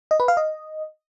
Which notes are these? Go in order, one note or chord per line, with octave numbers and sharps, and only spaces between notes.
D#5
B4
F5
D#5